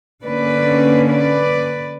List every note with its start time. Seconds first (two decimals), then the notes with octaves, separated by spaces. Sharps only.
0.24 D3 A#3 C#4 B4 D5
1.08 B4 D5